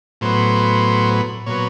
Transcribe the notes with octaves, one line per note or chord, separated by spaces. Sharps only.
A2 F#3 B3 C5
A#2 F#3 B3 C#5